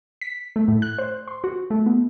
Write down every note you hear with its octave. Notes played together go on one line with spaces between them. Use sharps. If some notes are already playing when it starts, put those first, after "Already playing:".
B6
A3
A2
F#6
C5
C6
F#4
A3
B3